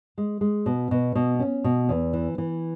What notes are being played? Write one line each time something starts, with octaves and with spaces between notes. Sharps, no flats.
G#3
G#3
B2
B2
B2
C#4
B2
E2
E3
E3